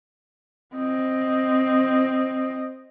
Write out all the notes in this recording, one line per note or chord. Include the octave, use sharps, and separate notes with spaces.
C4 D#5